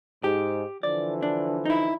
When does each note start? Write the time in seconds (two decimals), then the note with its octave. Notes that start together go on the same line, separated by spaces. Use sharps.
0.24 G#2 G4
0.83 D3 E3 F3 D5
1.23 D4
1.65 D#4 E4